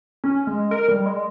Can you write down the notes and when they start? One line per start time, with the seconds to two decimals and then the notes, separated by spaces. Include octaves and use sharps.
0.24 C#4
0.47 G#3
0.71 A#4
0.88 G3
1.06 G#3